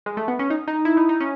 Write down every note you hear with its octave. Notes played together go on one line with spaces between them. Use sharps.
G#3
A3
B3
C#4
D#4
D#4
E4
D#4
D#4
C#4